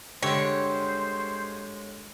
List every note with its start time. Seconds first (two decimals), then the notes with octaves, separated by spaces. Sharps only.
0.23 G2 D3 G#3 G4 C5 C#5